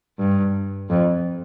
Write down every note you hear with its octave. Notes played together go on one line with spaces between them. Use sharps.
G2
F2